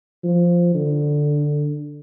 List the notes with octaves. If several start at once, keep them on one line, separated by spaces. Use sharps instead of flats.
F3
D3